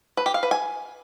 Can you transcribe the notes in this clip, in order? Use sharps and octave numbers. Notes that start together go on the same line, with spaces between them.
B4
G4
F5
B4
G#5